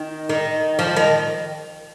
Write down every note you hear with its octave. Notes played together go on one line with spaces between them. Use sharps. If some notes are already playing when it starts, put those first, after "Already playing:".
Already playing: D#3
D#3
F3
D#3